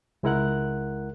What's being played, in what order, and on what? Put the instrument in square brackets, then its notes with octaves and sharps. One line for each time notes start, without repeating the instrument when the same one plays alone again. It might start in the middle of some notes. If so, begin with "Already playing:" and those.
[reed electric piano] C#2 G#3 E4 A#4 F#5 F#6